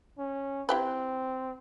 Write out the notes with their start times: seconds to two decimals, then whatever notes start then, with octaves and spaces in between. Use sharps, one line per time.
0.18 C#4
0.69 C4 E4 G4 B4